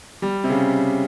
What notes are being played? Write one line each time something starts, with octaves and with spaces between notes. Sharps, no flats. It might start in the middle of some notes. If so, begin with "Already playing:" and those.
G3
C3
C#3